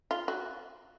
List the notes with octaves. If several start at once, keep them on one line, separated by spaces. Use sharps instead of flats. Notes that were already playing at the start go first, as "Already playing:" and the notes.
F4
F#4